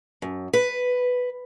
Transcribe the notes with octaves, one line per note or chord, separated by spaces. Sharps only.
F#2
B4